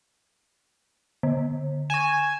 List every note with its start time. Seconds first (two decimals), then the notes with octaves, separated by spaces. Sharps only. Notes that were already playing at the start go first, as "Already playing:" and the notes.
1.23 D3
1.90 G#5 C#6 E7